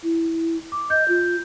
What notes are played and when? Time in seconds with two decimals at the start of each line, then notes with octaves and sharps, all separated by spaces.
0.03 E4
0.72 D6
0.90 D#5 G6
1.08 F4